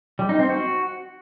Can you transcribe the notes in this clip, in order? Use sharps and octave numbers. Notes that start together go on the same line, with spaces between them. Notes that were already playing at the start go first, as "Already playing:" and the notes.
G3
D#4
C4
F#4